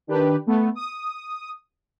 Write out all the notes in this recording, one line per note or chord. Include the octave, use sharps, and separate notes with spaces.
D#3 D4 G4 B4
A3 B3
D#6